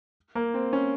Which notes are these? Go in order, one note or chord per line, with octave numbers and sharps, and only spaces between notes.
A#3
C4
C#4